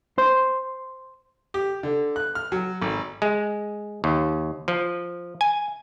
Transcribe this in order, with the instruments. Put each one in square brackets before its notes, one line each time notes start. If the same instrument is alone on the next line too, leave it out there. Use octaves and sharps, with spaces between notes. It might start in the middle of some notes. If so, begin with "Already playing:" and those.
[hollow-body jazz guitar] C5
[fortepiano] G4
D3
F#6
F6
F#3
G#1
[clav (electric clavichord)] G#3
D#2
F3
G#5